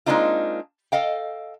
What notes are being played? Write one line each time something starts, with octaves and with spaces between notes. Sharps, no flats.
G#3 A#3 C4 D4 D#4 F4
A4 D#5 F5 G5